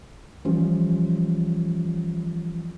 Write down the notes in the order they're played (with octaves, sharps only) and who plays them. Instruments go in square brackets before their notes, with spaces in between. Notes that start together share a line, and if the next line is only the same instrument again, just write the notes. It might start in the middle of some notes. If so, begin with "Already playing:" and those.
[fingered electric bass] E3 F3 G3 C#4